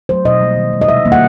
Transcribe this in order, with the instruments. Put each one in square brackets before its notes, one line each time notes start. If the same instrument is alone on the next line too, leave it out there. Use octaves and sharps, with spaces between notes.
[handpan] F#3 A3 C5
B2 D#5
G3 A#3
D#3
G#3
D#5
C3 E5
D#3 G3 A#3
F#5